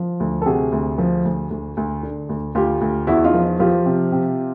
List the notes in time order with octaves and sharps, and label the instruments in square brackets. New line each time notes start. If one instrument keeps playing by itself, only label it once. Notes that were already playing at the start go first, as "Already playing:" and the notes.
Already playing: [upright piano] F3
D2
A4
C3 F#4 G#4
D2
F3
D2
D2
D2
D3
D2
D2 F4 G4
D2
E2 E4 F#4
D#4 F4
F3
F3 F4 G4
C3
C3